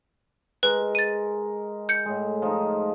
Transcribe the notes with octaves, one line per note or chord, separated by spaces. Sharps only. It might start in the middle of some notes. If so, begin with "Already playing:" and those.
G#3 A#4 B4
A6 D#7
G6 C#7
A2 G#3
F3 D#4